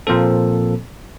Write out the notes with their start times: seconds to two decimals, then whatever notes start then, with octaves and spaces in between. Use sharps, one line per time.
0.07 A#2 F3 A#3 C4 A4